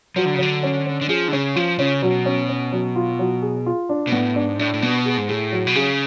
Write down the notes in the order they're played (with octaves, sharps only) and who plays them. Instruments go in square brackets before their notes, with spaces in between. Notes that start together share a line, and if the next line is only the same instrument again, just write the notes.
[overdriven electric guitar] F3 [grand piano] F#3
[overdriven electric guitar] D3
C#3
[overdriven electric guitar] D3 [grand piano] F#3
[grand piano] C#4
C#4
[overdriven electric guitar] D3
[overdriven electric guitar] F3 [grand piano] G#4
[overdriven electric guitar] D3
[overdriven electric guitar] C#3 [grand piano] C#4
[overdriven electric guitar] F3 [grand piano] F4
[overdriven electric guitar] C#3 [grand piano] C#4
[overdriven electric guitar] B2 [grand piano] F#3
[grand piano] C#4
C#4
F#3
F4
F#3
G#4
F4
D4
[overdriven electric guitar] B2
[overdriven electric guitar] A2 [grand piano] B3
[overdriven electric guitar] G#2 [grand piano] D4
[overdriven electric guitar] A2 [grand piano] D4
[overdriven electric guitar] A2
[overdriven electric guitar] B2 [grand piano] B3
[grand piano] G#4
[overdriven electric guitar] G#2
[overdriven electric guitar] A2 [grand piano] G#4
[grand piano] F#3
[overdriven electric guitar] B2
[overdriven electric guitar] C#3 [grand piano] G#4